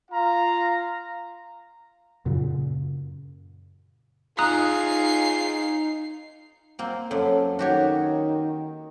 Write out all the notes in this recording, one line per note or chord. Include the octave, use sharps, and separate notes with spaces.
F4 F5 A#5
F#2 A#2 C#3
D#4 F4 G#4 A#5 D#6 F#6 C7
A#3 C4
F#2 A4
D#3 F#4 G4 C#5